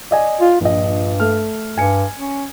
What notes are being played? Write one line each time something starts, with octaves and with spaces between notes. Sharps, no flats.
D5 D#5 G#5
F4
A#1 G2 F3 D#5
A3 F6
G2 G#5 C#7
C#4